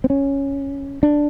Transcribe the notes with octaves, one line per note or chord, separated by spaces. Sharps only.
C4
C#4
D4